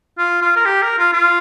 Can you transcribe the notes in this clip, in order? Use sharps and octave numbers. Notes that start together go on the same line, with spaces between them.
F4
F4
A#4
G4
A#4
F4
F4